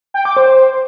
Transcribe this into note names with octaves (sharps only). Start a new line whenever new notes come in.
G5
D6
C5